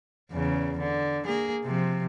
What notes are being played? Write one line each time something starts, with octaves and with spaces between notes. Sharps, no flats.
E2 C#3
D3
A#3 G#4
C3 F3